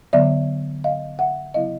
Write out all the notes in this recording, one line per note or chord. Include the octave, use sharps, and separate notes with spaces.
D3 F#3 B3 D5 E5
D#5 F5
E5 F#5
C#3 F#3 B3 E4 D#5 F5